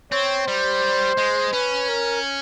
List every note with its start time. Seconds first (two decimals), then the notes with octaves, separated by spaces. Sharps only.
0.12 C4 C#5
0.47 G3 C5
1.18 G#3
1.53 C#4 B4
1.89 A#4